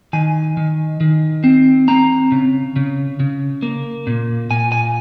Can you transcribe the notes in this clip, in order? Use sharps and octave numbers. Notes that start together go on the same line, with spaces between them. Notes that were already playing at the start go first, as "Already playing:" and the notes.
D#3 G#5
D#3
D#3
C4
C4 A#5
C#3
C#3
C#3
A#3
A#2
A#2 G#5
G#5